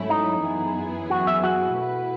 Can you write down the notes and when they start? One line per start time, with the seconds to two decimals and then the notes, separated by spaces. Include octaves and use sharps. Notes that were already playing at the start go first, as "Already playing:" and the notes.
Already playing: G#2 F#3 A3 C#4 E4
0.09 D#4
0.44 F#2 E3 B3 E4 G#4
1.10 F#4
1.27 E5
1.44 F#4
1.77 B2 A3 E4 B4